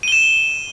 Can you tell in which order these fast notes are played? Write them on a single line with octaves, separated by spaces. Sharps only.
D#7 G7 E7